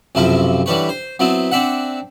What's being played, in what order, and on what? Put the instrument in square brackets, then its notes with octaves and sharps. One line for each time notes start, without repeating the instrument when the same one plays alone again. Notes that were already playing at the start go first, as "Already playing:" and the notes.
[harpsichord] B1 F#2 C3 F3 E4 A#4
D3 E3 G3 B4 C#5
C5
F#3 B3 C4 E4
C4 D4 E5 F#5